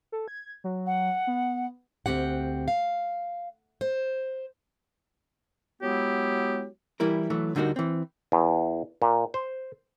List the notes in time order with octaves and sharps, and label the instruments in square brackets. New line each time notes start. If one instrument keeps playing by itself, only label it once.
[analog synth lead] A4
G#6
F#3
[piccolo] F#5
[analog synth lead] B3
[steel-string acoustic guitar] D2 C4 G4 F#5
F5
C5
[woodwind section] F#3 G#3 B3 E4 G4
[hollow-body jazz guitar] E3 G3 E4 A#4
E3 F#3 A3
D2 D3 G3 D#4 F#4 A#4
E3 C4
[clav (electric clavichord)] E2
A#2
C5